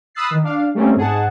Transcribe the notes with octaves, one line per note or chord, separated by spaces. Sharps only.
B5 D#6 E6 F#6 A6 C7
D#3
D4 F5
G3 A3 A#3 C4 C#4
G#2 G#4 F#5 A5